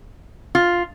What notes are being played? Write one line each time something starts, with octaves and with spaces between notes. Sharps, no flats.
F4